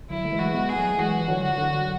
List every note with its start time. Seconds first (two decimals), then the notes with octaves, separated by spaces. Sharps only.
0.10 D3 F#3 E4
0.25 A3
0.32 E3 G#3
0.39 F#4
0.54 G#3 B3
0.69 G#4
0.77 F#3 A3
0.99 E3 G#3 F#4
1.21 E3
1.28 D3 F#3
1.43 F#4
1.57 D3 F#3